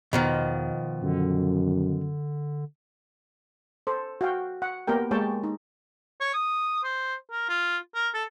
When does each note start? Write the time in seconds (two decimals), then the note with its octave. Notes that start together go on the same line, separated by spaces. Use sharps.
0.13 E2 B2 D#3 F3
1.03 F#2 D3
3.87 A4 C5
4.21 F#4 F5 G5
4.62 F#5
4.87 A#3 B3 G4 A#4 G5
5.11 G#3 A#3 G4 C#5 G5 A5
5.43 D#4
6.21 C#5
6.34 D#6
6.84 C5
7.31 A#4
7.49 F4
7.95 A#4
8.14 A4